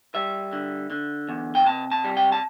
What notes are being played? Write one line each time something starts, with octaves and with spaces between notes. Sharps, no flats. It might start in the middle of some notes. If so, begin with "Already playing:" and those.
G3 E5
D3
D3
E2
G5
C3 A5
A5
G3
G5
A5